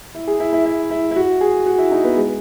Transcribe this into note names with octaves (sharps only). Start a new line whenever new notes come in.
E4
G#4
E4
E4
E4
E4
E4
F#4
G#4
F#4
E4
D#4
B3
G#3